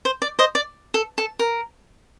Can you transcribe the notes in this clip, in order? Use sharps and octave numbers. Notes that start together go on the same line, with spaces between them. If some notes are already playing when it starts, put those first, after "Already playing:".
C5
D5
C5 D#5
D5
A4
A4
A#4